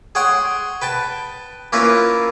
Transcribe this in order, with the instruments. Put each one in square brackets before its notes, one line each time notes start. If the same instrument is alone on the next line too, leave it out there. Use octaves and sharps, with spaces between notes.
[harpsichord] G#4 C#5 F#5 G5 C6
B4 G5 A5
A#3 C#4 E4 F4 A#4 B4